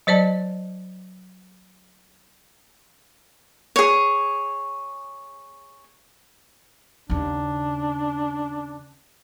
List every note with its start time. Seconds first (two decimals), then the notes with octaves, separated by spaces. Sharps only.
0.07 F#3 C5 D5 D#5 A5
3.76 G#4 C#5
7.10 D#2 C#3 D4